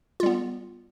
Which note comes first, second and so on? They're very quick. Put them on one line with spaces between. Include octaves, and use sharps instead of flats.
F4 G3 B3